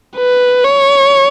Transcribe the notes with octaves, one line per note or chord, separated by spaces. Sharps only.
B4
C#5